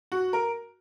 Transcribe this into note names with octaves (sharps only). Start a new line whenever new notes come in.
F#4
A#4